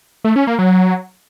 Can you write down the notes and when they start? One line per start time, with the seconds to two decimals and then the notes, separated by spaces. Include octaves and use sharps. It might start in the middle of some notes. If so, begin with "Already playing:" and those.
0.24 A3
0.36 C#4
0.47 A#3
0.59 F#3